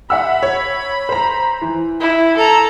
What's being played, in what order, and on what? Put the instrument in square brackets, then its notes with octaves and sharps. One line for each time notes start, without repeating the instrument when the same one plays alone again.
[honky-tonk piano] E5 F#5 E6 [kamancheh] B5
[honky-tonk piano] C#5
C5 A#5
E3
[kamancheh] E4
A4 A#5